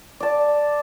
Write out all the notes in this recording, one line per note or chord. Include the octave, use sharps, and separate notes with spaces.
D5 A5